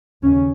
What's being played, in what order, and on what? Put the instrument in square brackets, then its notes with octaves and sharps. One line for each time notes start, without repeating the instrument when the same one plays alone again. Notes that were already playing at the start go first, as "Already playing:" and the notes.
[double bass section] D#2 C#3 C#4